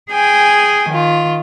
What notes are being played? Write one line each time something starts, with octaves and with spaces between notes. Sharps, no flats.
G#4 G5 G#5
D#3 F4